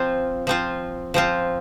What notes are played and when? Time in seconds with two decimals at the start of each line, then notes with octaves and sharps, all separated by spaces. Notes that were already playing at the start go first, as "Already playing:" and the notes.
Already playing: F3 C4 F4
0.47 F3 C4 F4
1.14 F3 C4 F4